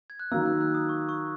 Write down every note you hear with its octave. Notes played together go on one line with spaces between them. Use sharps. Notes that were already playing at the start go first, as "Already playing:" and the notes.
G#6
F#6
D#3 F#3 A#3 E6
F#6
F#6
D#6
C#6
C#6